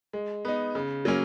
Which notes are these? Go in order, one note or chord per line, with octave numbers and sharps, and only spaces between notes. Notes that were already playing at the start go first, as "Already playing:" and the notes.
G#3
B3 D#4
C#3
F#3 A#3 C#4